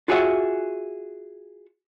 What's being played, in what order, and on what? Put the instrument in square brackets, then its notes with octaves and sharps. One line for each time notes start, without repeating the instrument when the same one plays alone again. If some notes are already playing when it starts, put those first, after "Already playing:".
[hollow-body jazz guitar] F4 F#4 G#4 C#5 E5 F#5